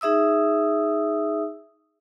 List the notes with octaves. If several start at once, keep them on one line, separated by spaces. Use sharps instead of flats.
D#4 G#4 E5 D#6 E6